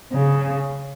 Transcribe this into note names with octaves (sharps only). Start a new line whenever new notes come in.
C#3